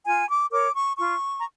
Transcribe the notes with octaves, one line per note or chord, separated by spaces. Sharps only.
F4 G#5
D6
A#4 C#5 D6
C#6
F4 C#6
A#5